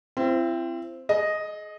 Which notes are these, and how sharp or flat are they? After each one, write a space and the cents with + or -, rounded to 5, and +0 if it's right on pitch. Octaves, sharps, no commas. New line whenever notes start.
C4 +0 E4 +40
G#4 +35 D#5 +0